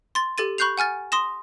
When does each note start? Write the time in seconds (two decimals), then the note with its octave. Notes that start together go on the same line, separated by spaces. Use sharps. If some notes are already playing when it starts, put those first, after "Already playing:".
0.15 C6 A6
0.38 G4 A4 A6 D#7
0.58 B5 C#6 F#6 G6 C7 F7
0.78 F#5 G#5 F6 A6
1.12 C6 D#6 A#6 E7